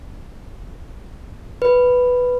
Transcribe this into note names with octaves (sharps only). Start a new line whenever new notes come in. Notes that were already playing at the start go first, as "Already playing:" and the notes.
B4